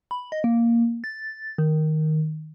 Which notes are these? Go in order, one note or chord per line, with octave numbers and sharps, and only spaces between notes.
B5
D#5
A#3
A6
D#3